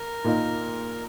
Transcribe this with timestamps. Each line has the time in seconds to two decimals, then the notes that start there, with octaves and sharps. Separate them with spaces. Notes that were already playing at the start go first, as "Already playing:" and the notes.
Already playing: A#4
0.24 A#2 A#3 D#4